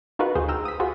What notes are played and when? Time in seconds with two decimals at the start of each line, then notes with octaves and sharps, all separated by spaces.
0.19 D#4 F4 F#4 A#4 B4
0.35 D2 F4 G#4 C5
0.48 G5 A#5 E6 F6 E7
0.65 D#6 B6
0.80 F4 F#4 G#4 C5